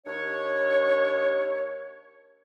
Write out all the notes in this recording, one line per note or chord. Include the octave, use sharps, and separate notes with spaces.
D#2 D4 C#5